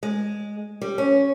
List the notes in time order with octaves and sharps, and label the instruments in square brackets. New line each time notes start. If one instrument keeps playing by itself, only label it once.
[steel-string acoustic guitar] G#3
G3
C#4